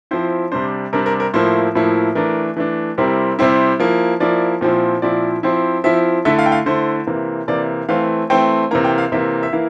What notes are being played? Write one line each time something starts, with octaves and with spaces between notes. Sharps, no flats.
F3 C4 E4 C5
C3 G3 D4 C5
C3 G3 D4 A#4
A#4
A#4
A2 F3 A#3 E4 C5
A2 F3 A#3 E4
E3 A3 D4 A#4
E3 A3 D4
C3 G3 C4 E4 A#4
C3 G3 C4 E4
F3 A#3 E4
F3 A#3 E4 D5
A#2 F3 C4 E4
A#2 F3 C4 E4 D5
F3 C4 E4
F3 C4 E4 E5
D3 A3 E4 E5
F5
G5
F5
D3 A3 E4 C5
C3 E3 A#3
C3 E3 A#3 D5
E3 A3 C4 F5
E3 A3 C4 G5
C3 E3 A#3 A#5
G5
F5
C3 E3 A#3 E5
E5
E3 A#3 E4 F5